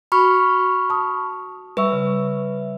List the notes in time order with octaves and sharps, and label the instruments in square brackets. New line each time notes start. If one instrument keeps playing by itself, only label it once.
[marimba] F#4 [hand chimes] B5 C#6 F6
[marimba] A5 D#6
[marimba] G3 C#6 E6 [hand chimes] B4 E5
[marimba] C#3